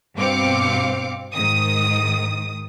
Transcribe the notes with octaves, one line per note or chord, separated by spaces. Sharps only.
G2 B2 C4 F5 D6 C#7
G#2 D#3 D#6